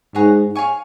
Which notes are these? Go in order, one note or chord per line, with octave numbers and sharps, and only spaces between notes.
G#2 G#4 C#5 F#5 A#5
C#5 F5 G#5 C#6